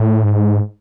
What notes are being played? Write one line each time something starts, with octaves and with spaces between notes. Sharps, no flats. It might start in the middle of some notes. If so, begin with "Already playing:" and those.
Already playing: A2
G#2